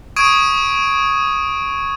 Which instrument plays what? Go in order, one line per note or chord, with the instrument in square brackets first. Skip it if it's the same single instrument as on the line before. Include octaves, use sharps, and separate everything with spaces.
[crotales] C#6 D#6 G#6 D7 D#7